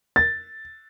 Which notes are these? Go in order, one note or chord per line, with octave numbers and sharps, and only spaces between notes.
A6